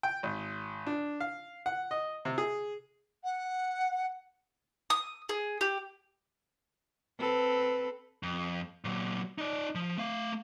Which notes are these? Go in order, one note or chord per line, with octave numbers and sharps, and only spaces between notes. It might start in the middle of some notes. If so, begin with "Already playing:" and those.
G5
G#1
D4
F5
F#5
D#5
C3
G#4
F#5
D#6
G#4
G4
C4 A4 B4
F2
A#2 F#3
D#4 D5
F3
A3 F5